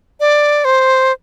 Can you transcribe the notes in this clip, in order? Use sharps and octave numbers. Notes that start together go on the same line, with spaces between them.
D5
C5